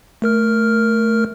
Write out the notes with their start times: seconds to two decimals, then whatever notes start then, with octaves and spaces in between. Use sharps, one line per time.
0.22 A3 A#4 F6